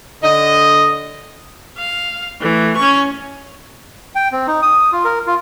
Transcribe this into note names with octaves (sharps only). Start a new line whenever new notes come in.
D3 D#5
F5
E3 A3
C#4 C#6
G5
C4
D#4
D#6
F4
A#4
F4